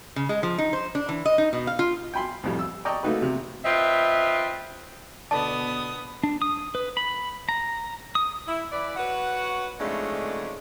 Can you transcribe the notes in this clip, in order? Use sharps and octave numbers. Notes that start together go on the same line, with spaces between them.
C#3
G#3
F3
D#4
C5
D4
E3
D#5
D#4
B2
F5
F4
G5 G#5 B5 C6
C2 F2 A2 G3
E6
D5 D#5 G5 A5 A#5 C#6
A3 A#3 D#4 F#4 B4
C3
C4 F4 B4 D#5 E5
B2 D3 B3 D5 A5 D#6
D4
D#6
B4
B5
A#5
D#6
E4
E3 E4 B4 D5
F#4 B4 C#5 F#5
F2 G#2 C#3 G#3 A3 D4